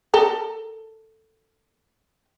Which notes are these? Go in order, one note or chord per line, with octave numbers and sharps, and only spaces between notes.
A4 A#4